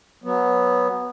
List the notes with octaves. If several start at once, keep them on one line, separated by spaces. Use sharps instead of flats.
F#3 B3